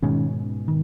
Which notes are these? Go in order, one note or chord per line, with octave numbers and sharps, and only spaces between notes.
G#2 B2 D#3 G#3 C#4
D#3